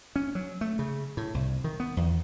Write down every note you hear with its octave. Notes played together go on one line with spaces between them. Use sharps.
C#4
F#3
A3
C#3
A2
C2
D#3
B3
E2